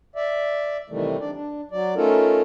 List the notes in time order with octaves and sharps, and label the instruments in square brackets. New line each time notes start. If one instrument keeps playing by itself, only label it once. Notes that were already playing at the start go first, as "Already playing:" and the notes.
[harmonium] D5 E5
C3 D#3 E3 G3 A3
D4 D5
D4
F#3 D5
A3 C#4 D#4 F4 A4 A#4